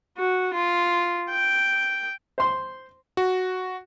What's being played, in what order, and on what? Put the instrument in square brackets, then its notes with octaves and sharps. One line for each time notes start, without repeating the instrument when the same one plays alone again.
[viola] F#4
F4
G5
[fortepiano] C5 C6
[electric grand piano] F#4